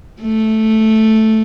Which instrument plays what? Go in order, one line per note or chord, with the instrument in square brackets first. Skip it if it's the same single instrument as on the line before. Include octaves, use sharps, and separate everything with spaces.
[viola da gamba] A3